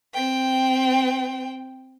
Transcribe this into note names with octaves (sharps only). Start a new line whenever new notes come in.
C4 G5